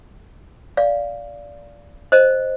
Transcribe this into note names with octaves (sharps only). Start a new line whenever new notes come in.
D5 F5
C5 D#5